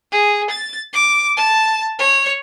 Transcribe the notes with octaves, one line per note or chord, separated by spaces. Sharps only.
G#4
A6
D6
A5
C#5